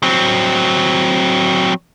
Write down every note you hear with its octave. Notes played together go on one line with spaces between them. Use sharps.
F#3 C4